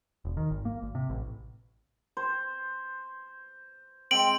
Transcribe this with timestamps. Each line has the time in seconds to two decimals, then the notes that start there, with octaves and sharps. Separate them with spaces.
0.25 E1
0.37 D#3
0.51 G#1
0.65 A#3
0.82 G#1
0.95 C3
1.10 A1
2.17 C5
4.11 G#3 C4 D7 F#7